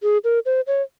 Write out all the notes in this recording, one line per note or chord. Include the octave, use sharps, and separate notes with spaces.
G#4
A#4
C5
C#5